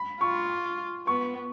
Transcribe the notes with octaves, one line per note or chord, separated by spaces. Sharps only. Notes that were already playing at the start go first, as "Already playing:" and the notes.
Already playing: B5
F4 C#6
B3 C#6